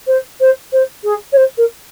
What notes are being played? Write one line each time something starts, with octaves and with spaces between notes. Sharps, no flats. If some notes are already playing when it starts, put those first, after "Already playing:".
C5
C5
C5
G#4
C#5
C5
A#4